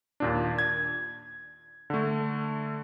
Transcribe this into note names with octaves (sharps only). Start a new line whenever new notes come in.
D#2 A#2 D4
G#6
D3 A3